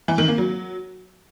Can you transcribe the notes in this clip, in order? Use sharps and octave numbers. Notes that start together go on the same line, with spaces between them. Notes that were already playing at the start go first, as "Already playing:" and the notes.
E3
D#3
A#3
F#3